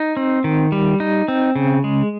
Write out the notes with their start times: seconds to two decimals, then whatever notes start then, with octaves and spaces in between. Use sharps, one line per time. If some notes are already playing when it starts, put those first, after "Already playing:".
Already playing: D#4
0.17 C4
0.44 D#3
0.72 G3
1.00 D#4
1.28 C4
1.56 C#3
1.84 G#3